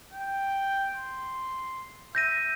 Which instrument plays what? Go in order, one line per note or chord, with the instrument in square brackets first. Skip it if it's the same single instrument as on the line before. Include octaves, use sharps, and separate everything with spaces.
[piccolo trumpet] G5
C6
[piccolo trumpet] E5 [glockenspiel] G6 A#6 D#7